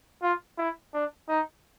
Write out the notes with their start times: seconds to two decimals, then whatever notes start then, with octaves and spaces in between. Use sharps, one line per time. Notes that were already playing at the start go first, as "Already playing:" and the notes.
0.22 F4
0.58 E4
0.94 D4
1.29 D#4